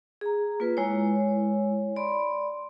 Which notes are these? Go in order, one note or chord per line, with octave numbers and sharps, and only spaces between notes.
G#4 A#5
A#3 F4 B4
G#3 E4 C#5
D5 B5 C6